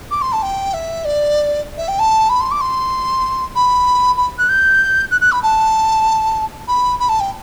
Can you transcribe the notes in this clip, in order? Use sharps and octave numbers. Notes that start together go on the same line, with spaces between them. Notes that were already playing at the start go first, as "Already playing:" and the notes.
D6
C6
A5
G5
E5
D5
E5
G5
A5
B5
C6
D6
C6
B5
B5
F#6
G6
F#6
F#6
B5
A5
B5
B5
A5
G5